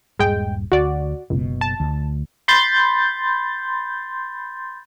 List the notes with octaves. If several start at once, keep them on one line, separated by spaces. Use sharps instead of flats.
D#1 G2 G#3 G5
D2 F#4 D5
F#1 C#2 B2
A5
D2
B5 C6 G6 A6